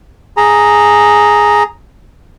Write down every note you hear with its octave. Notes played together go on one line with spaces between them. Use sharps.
G#4 A#5